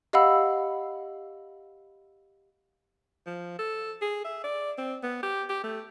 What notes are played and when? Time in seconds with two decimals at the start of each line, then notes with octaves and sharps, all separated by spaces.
0.13 G4 D#5 F5 F#5 B5 E6
3.26 F3
3.59 A4
4.02 G#4
4.25 E5
4.44 D5
4.78 C4
5.03 B3
5.23 G4
5.50 G4
5.64 A3